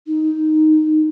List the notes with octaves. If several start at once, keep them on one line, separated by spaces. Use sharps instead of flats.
D#4